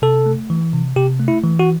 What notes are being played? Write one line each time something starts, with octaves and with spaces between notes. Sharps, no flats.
C3 A4
A3
E3
C3
C3 G4
A3
E4
E3
F#4